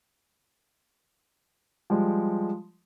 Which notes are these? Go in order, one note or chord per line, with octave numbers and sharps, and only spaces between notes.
F3 G3 G#3